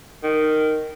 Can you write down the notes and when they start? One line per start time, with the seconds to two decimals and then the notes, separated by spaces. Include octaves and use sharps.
0.23 D#3